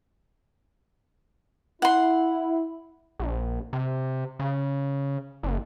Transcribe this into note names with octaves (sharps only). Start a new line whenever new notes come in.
E4 F#5 C6
A#1
C3
C#3
F#1